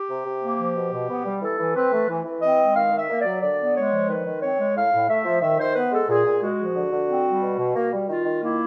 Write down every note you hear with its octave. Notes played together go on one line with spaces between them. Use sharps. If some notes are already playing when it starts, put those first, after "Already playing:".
Already playing: G4
C3
C3
A#3
F3
B2
B2
B3
G3
E3 A4
E3
C4 B4
A3
E3
E3
C4 D#5
G#3
D#3 F5
D#3
E5
A#3
D5
F#3
D3 D5
B3
G#3 C#5
F3
D#3 B4
D#3
C4 C#5
G#3
A2 F5
A2
A3 E5
F3
D#3 E5
D#3 C5
B3 B4
G#3 A4
A#2 G#4
A#2
G#3 F#4
F3
D3
D3
C4
G3
B2
B2
A#3
G3
D#3 F4
D#3
A#3 E4